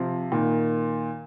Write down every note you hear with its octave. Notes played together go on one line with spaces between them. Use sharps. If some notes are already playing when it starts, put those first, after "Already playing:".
Already playing: C3 F3
A#2 D#3